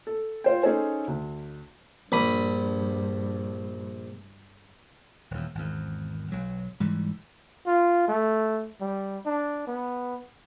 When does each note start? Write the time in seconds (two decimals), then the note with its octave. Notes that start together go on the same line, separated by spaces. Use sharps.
0.07 A4
0.44 F4 C5 G5
0.63 C#4 D#4 G#4 A4 C5 G#5
1.08 D2
2.12 A#1 G2 B5 D#6
5.31 D#1 E2
5.55 G#1 E2
6.32 B1 F#3
6.80 G#2 E3 G3
7.67 F4
8.08 A3
8.81 G3
9.26 D4
9.67 B3